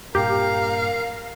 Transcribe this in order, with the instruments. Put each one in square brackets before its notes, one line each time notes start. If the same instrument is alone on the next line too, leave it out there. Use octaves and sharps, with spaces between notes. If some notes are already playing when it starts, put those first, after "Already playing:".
[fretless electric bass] G2 A#2 [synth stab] G4 [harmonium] A#4 A#5 [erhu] F5